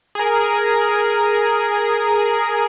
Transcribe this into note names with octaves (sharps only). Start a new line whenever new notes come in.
G#4 A#4